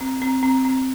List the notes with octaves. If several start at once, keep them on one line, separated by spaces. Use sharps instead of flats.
C4
C4
C4
C4